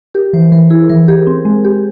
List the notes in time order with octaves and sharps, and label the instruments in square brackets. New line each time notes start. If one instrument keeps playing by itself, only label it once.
[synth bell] G4 [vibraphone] A#4
[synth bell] E3 [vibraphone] C5
[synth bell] E3 [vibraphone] A#4
[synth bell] E4 [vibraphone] G#4
[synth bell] E3 [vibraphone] A#4
[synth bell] G4 [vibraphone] G#4
[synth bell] C4
G#3
G4